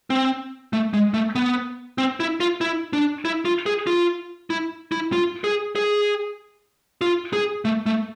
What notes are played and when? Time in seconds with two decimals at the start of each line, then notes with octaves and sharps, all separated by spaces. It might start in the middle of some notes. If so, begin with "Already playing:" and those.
0.10 C4
0.73 A3
0.94 G#3
1.14 A3
1.35 B3
1.98 C4
2.20 E4
2.40 F4
2.61 E4
2.93 D4
3.25 E4
3.45 F4
3.66 G#4
3.87 F4
4.50 E4
4.92 E4
5.12 F4
5.44 G#4
5.76 G#4
7.01 F4
7.33 G#4
7.65 A3
7.86 A3